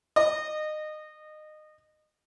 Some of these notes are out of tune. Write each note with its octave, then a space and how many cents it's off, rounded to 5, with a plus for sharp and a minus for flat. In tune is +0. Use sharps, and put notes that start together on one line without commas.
D#5 -25